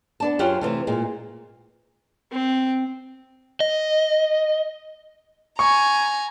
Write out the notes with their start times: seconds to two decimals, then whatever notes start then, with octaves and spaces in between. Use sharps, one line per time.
0.20 B3 D4 A5
0.39 F#2 C#4 F4 G4 C5 F#5
0.61 C3 E3 A3
0.87 A#2 G#3
2.32 C4
3.60 D#5
5.59 G#5 A#5 C#6